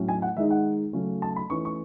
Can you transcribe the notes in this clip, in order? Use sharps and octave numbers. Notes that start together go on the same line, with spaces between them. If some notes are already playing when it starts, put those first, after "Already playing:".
Already playing: A2 F#3 C#4
G#5
F#5
D#3 G#3 D#4 E5
F#5
C#3 F#3 A3 C#4
A5
B5
E3 A3 C#4 C#6
C#6